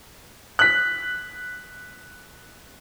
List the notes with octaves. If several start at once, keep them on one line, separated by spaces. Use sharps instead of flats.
F#6 B6